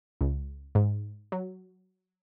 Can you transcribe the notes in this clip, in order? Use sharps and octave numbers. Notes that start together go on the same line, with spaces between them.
C#2
G#2
F#3